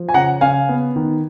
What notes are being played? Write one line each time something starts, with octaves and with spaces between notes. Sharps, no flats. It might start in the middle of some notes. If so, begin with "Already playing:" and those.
Already playing: F3
G#5
C#3 F#5 A#5
C#3 F5 G#5
B3
D#3